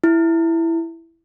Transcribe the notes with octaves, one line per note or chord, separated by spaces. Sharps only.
E4